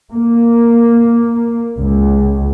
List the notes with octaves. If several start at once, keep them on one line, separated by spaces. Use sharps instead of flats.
A#3
C#2